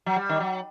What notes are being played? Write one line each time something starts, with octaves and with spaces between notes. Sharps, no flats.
F#3
G3
D#3
F#3